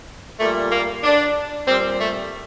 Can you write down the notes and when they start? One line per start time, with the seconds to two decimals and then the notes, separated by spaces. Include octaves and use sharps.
0.39 A#2 G3 A3
0.72 A#3
1.04 D4
1.67 A#2 G3 C4
1.99 A3